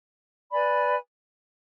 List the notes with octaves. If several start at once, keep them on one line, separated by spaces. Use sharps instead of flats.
B4 D5 G#5 B5